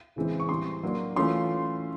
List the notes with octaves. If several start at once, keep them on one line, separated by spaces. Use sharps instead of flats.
C#3 E3 G#3 C4
C#6
E3 G3 C4 C6
F#3 A#3 D4
E3 A3 C#4 F4 C6